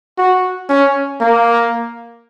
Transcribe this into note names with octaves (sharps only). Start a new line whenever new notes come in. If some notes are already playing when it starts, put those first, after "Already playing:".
F#4
C#4
A#3